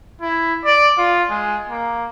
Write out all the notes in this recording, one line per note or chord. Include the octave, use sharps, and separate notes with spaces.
E4
D5
F4
G#3
A#3